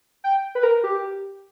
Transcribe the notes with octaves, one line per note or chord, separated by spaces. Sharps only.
G5
B4
A#4
G4